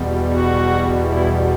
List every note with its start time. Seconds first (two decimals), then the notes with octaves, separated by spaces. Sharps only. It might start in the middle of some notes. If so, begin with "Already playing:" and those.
Already playing: E2 B2 G3
0.26 F#4
1.01 E4